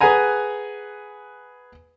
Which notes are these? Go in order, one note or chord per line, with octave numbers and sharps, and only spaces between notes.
G#4 B4 F#5 G#5 A#5